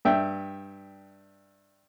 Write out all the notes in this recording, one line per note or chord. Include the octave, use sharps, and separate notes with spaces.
G2 E5 G5